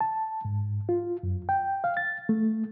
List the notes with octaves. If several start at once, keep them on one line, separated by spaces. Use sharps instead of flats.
A5
G#2
F4
F#2
G5
F5
A6
A3